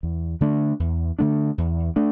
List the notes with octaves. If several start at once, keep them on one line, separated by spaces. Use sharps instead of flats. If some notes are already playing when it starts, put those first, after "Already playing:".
E2
D3 A3 D4
E2
D3 A3 D4
E2
A3 D4